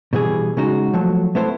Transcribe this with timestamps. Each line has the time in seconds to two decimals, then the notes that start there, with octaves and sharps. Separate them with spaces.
0.13 B2 E3 G3 G#4
0.57 C#3 G#3 D#4 F#4
0.93 F3 F#3 A3
1.35 A3 B3 E4 C5